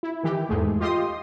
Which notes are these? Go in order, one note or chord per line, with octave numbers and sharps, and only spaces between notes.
E4
D#3 E3 G4
E2 G#2 G#3 A3
F4 G4 D#5 C6 D#6